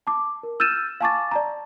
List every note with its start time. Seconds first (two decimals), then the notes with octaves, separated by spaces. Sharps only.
0.07 A5 D6
0.43 A#4
0.60 E6 F6 G6 A6 D#7 E7
1.01 F5 G#5 A5 C#6 D6 A6
1.31 D5 A5 A#5